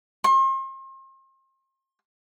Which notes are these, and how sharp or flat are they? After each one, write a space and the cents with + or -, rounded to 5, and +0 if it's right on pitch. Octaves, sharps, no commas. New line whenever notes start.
C6 +40